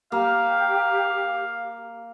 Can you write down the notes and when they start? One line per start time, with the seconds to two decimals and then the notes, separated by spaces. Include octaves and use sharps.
0.12 A#3 G4 F5